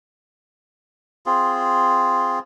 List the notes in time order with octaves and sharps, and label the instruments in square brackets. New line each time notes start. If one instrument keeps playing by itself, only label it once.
[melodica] C4 F4 G#4